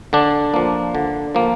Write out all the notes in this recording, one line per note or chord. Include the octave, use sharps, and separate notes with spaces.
D3 D4
F3 A#3
D3
F3 A#3